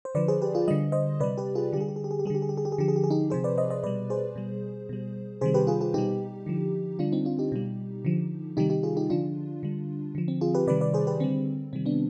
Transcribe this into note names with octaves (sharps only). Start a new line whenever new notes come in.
C5
D3 F3 B4 D5
G#4 C5
G4 B4
F4 G#4
D3 G3 D#5
C5 D#5
C3 G3 B4 D5
G4 B4
F4 G#4
D3 G3 G4 G#4
G4
G#4
G4
G#4
G4
D3 G3 G4 G#4
G#4
G4
G#4
G4
G#4
D3 F3 G4
G#4
G4
G#4
D#4 G4
C3 F3 G#4 C5
B4 D5
C5 D#5
C5 D#5
B2 G3 B4 D5
G#4 C5
B2 G3
B2 G3
C3 D#3 G3 G#4 C5
G4 B4
F4 G#4
F4 G#4
B2 G3 D#4 G4
D3 F3
D3 G3 D4 F4
C4 D#4
D4 F4
D#4 G4
B2 G3
D3 F3
C3 D#3 G3 D#4 G4
D#4 G4
F4 G#4
D#4 G4
D3 F3 D4 F4
D3 G3
D3 F3
C4
F4 G#4
G4 B4
C3 D#3 G3 B4 D5
B4 D5
G#4 C5
G4 B4
D3 G3 C4
C3 D#3 G3 C4
B3 D4